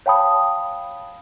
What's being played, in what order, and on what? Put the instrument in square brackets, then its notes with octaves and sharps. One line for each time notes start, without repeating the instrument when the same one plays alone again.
[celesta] C#5 F5 G5 A5 B5 D#6